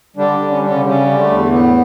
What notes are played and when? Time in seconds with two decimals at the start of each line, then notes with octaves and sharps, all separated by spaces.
0.16 D3 G3 D4
0.39 D3
0.50 C#4
0.61 G3 D4
0.70 C#3 C#4
0.84 C#3 G3 C#4
1.07 D3
1.18 A3
1.29 E2
1.51 A2 B3